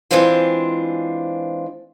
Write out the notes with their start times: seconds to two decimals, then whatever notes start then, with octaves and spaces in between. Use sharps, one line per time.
0.11 E3 G#3 C4 D4 F4 C5